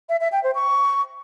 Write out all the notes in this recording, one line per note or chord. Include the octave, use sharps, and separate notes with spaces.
E5
E5
G5
C5
C#6